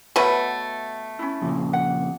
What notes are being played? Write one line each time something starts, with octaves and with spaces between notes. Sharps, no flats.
B2 A3 B4 C#5 F#5
C#4 D4 E4
F2 A#2 C#3
F#5